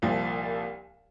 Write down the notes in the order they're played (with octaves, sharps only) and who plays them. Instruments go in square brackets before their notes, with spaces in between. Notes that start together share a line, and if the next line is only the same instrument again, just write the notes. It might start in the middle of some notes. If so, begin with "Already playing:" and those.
[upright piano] C2 A#2 F3